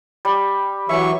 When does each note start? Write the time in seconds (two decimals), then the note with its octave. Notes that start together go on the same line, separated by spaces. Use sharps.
0.25 G3
0.89 E3 F#3 E5 G#5 C#6